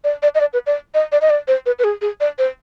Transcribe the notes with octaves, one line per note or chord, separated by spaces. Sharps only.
D5
D5
D#5
D5
B4
D5
D#5
D5
D#5
D5
C5
B4
B4
G#4
G#4
D5
C5